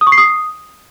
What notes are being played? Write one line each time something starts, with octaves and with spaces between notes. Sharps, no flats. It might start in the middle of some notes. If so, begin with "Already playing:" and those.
D#6
C#6
C7
D#6